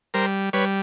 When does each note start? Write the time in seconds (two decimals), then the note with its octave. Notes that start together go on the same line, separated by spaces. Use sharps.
0.14 G3 A#4 C5
0.53 G3 B4 C#5